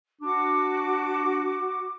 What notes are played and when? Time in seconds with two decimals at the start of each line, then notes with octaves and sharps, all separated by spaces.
0.21 D4 F#4 D6